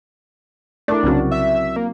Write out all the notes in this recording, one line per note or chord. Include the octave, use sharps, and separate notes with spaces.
A3 D4 E4 A#4 D5
C2 C#3 F#3 C4 F#4
E5
A#3